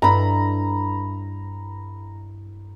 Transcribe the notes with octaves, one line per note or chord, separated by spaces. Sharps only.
G2 E4 A4 A#5 B5